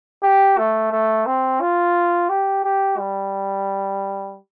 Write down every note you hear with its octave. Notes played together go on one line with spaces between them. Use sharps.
G4
A3
A3
C4
F4
G4
G4
G3